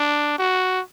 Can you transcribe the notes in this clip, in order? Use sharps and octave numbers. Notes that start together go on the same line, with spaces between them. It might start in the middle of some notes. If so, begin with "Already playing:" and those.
Already playing: D4
F#4